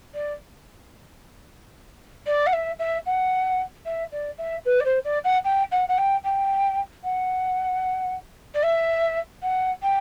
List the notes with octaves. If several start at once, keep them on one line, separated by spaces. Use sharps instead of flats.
D5
D5
F#5
E5
E5
F#5
E5
D5
E5
B4
D5
C5
D5
F#5
G5
F#5
F#5
G5
G5
F#5
D5
E5
F#5
G5